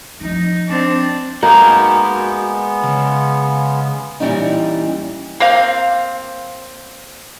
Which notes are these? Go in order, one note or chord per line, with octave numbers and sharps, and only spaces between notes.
F3 A3 D#4
C4 D4
G#3 A#3 B3 D#4 F#4 G#5
C#3
A#2 E3 G3 C#4 D#4
A#3 C4 F5